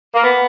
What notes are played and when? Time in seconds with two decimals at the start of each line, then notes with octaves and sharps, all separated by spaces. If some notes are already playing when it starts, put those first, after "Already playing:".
0.14 A#3
0.23 B3